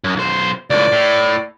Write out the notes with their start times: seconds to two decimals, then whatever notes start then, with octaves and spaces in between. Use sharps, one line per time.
0.04 F#2
0.16 B1 C5
0.70 C#2 A2 D5
0.92 A2